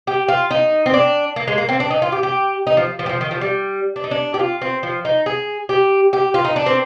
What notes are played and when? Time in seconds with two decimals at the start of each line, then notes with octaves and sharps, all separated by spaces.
0.07 G4
0.28 F4
0.51 D#4
0.86 C4
0.94 D4
1.36 A#3
1.48 G#3
1.58 A#3
1.69 C4
1.80 D4
1.91 D#4
2.02 F4
2.12 G4
2.23 G4
2.67 D#4
2.77 F3
2.99 F3
3.06 G3
3.09 F3
3.21 D#3
3.31 F3
3.41 G3
3.96 D4
4.04 D#4
4.11 D4
4.34 G4
4.39 F4
4.62 C4
4.83 F3
5.05 D#4
5.26 G#4
5.69 G4
6.13 G4
6.34 F4
6.45 D#4
6.56 D4
6.66 C4